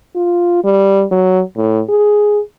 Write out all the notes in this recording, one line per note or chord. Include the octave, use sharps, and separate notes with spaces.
F4
G3
F#3
A2
G#4